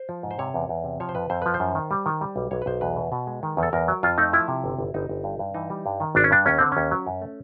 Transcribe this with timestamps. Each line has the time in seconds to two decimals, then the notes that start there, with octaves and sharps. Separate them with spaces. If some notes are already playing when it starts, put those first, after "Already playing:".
Already playing: C5
0.09 F3
0.23 G#2
0.31 C5
0.38 C3 C#5
0.54 E2
0.69 E2
0.84 C3
1.00 F3 C#5
1.09 C5
1.15 F2 B4
1.30 F2 C5
1.42 F3 B4
1.54 C5
1.60 F#2
1.75 D#3
1.91 G3
2.06 D#3
2.21 G3
2.36 B1
2.51 B1 C#5
2.62 B4
2.66 B1 C5
2.81 E2 B4
2.97 B2
3.12 B2
3.27 G#3
3.43 D#3
3.57 E2
3.63 A4
3.73 E2 A#4
3.88 F#3
4.03 F2 F4
4.18 A3 D#4
4.33 F3 E4
4.48 C3
4.64 G1
4.78 G1
4.94 G1 D#4
5.09 G1
5.24 G2
5.39 G2
5.54 E3 D#4
5.70 G3
5.86 G2
6.00 D#3
6.15 G#1 D4
6.24 C#4
6.31 G2 D4
6.46 D#2 C#4
6.58 D3 C4
6.72 D#2 C#4
6.91 F#3
7.07 F#2
7.22 A3